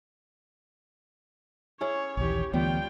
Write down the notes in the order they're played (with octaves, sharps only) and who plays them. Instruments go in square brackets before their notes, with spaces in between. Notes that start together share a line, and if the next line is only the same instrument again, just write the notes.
[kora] C#4 E4 G#4 [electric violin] C#5
[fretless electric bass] A#1 D#2 E3 [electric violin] G4 C#5
[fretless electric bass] D2 E3 B3 [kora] G3 [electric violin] F4 G5